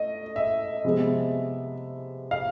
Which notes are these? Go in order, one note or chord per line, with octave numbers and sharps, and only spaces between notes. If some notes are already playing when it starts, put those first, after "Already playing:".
Already playing: A3 D#5
E5
C3 F3 G#3 B3
F5